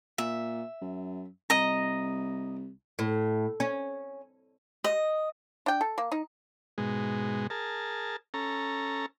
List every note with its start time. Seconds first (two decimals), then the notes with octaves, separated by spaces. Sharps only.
0.18 A#2 E5
0.81 F#2
1.50 C2 D#5 A#5
2.99 A2
3.60 C#4
4.84 D#5
5.66 D4 G5
5.81 A4
5.98 A#3
6.12 D#4
6.78 G#2 B2 G#3
7.50 G#4 A#4 A5
8.34 C#4 A4 A#5